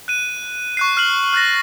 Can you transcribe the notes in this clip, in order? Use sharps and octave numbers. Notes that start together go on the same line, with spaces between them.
F#6 D#7
C#6 F#6 C7
F6 C7 F#7
F6 F#6 A6 A#6